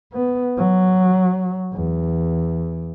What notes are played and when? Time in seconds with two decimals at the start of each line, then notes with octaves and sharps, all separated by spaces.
0.13 B3
0.58 F#3
1.73 E2